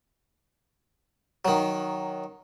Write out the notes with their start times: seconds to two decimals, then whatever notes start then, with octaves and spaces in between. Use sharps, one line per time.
1.45 D#3 F#3